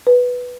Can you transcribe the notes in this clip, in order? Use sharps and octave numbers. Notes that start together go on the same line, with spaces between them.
B4